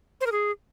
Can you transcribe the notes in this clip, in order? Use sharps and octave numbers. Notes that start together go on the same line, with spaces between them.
C5
A#4
G#4